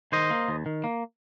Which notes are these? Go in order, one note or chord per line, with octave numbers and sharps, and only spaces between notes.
D#3 C5 D#5
A#3
D#2
D#3
A#3